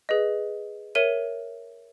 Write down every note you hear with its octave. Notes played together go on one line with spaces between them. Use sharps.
G#4 B4 D#5
A#4 C#5 E5 D#7